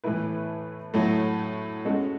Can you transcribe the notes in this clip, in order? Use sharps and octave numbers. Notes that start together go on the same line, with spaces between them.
A2 E3 A3 E4 B4
A2 F#3 A3
G#3 C#4 F#4 A4